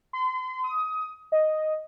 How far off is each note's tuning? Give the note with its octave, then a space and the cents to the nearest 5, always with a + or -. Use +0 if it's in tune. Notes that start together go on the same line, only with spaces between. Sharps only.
C6 -35
D#6 +20
D#5 +0